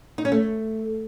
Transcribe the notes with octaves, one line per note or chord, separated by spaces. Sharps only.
D#4
C#4
A3